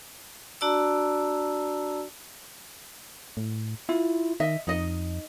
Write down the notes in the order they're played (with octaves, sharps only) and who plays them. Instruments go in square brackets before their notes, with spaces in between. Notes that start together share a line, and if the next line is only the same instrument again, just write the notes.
[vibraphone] D4 F#4 D5 A5 A#5 E6
[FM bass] A2
[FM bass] E4 [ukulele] F4
[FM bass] D#3 [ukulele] D#5 E5
[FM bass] F2 [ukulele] D#4 D#5